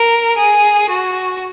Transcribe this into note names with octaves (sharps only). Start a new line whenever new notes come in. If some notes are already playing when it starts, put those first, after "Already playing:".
Already playing: A#4
G#4
F#4